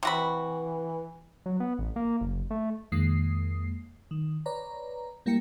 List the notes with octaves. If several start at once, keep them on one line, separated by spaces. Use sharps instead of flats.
C3 E3 F#4 B5
F#3
B3
A1
A#3
F#1
A3
F2 D#3 G#3 A#3 D#6 C7
D#3
B4 C#5 D5 A#5
G3 A#3 E4 A#4 G5 C#7